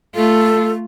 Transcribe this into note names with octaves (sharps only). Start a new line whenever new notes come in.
A3 F4 A4